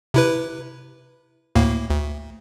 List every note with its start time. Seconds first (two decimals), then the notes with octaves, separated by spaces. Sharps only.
0.14 C3 E4 B4
1.55 D2 A2 A#3
1.90 D2